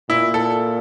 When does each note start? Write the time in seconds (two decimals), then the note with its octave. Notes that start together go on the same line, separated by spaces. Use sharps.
0.10 A#2 E4
0.34 A4